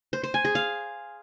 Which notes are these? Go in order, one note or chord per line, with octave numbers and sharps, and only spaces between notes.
C5
C5
G#5
G#4
F5